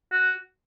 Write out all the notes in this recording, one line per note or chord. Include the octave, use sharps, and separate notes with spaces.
F#4